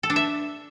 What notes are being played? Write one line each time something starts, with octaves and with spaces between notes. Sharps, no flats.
A4
D4
E5